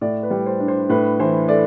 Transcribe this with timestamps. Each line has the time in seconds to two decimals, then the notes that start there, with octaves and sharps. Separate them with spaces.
0.01 A2 D5
0.23 B4
0.30 G3
0.46 C5
0.60 D4
0.68 C5
0.89 A2 B4
1.20 E3 C5
1.48 A3 D5